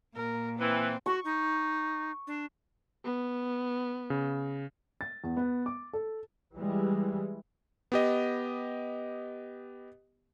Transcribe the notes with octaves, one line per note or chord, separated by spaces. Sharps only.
A#2 A#4
E3 C4
F#4 C#6
D#4
D4
B3
C#3
A6
E2
B3
D6
A4
E3 G3 G#3
B3 G4 D#5